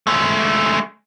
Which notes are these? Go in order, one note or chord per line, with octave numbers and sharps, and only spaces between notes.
G#3 A3